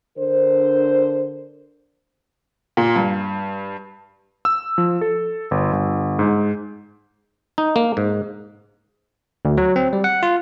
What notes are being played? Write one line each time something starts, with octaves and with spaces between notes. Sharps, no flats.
D3 D4 A#4 C5
A#2
G2
E6
F3
A4
G1
G1
G#2
D#4
A#3
G#2
D2
F#3
C4
G3
F#5
F4